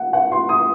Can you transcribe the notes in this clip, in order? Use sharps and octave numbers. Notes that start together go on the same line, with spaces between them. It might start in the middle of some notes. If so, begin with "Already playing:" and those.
Already playing: F#5
F#5
C6
D#6